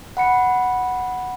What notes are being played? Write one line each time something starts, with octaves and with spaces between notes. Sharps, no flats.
F#5 B5 C#7